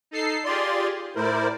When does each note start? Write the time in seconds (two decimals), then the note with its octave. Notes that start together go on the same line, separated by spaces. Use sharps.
0.11 D#4 A4 C7
0.45 F4 G4 G#4 D5 C6
1.16 A2 E4 A#4 C5 D5